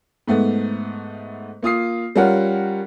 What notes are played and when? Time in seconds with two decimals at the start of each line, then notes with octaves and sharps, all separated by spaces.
0.27 G#2 A3 B3
1.63 A#3 F4 D#6 C7
2.16 G3 C#4 F4 A#4 F#5